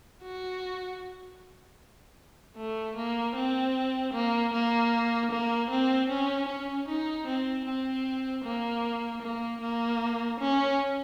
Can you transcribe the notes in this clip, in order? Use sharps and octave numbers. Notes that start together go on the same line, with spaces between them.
F#4
A3
A#3
C4
A#3
A#3
A#3
C4
C#4
C#4
D#4
C4
C4
A#3
A#3
A#3
C#4